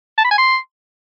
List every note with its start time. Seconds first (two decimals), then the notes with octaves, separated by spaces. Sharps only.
0.18 A5
0.24 B5
0.31 G#5
0.38 C6